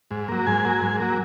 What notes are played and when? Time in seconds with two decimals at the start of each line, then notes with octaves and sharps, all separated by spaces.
0.11 G#2
0.28 F#3 A#3
0.47 G#2 G#5
0.65 F#3 A#3
0.82 G#2
1.00 F#3 A#3